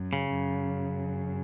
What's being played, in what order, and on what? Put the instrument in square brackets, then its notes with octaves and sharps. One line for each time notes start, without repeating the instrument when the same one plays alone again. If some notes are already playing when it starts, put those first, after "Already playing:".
Already playing: [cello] F#2
[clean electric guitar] C#3
[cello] F#2